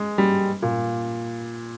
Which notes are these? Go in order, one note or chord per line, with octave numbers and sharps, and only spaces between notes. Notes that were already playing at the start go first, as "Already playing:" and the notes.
Already playing: G#3
G3
A#2